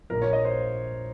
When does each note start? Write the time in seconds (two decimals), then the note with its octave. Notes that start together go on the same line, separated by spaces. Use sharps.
0.10 A#1 A#2 F3 A#4
0.22 C#5
0.33 D#5
0.45 C5